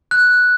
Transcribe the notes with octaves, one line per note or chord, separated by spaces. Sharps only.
F#6